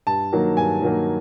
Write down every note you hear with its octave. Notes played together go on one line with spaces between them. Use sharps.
G2 A5
D#3 F#3 A#3
G2 G#5
D#3 F#3 A#3